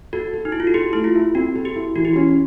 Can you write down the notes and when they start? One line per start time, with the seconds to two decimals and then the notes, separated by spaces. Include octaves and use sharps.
0.13 F#4 A4
0.33 A4
0.45 D#4
0.52 E4 A4
0.60 F4
0.67 F#4
0.74 G4 A4
0.93 A3 E4
1.04 F4
1.15 E4
1.35 C4 F#4
1.55 A4
1.65 G4
1.76 E4
1.96 E3 F#4
2.05 G4
2.14 C#4 F#4